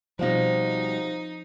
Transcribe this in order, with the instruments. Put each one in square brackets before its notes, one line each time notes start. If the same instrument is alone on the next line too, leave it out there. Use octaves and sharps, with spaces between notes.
[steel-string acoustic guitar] B2 G3 [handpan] F3 C4 [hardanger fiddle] D#4 [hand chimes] C5 F5 A#6